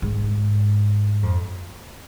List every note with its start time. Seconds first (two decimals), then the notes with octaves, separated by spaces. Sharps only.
0.02 G#2
1.23 F2